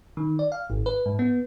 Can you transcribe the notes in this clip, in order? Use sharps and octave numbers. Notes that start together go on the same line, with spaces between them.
D#3
D5
F5
G#1
B4
G#2
B3